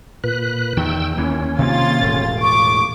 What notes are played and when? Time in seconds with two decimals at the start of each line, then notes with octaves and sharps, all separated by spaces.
0.24 A#2 B4 F#6
0.77 E2 D#3 G5 E6
1.18 D#2 E3 C#4
1.59 C3 D#3 A#3 F4 A6
2.02 E1 A2
2.42 C#6 D6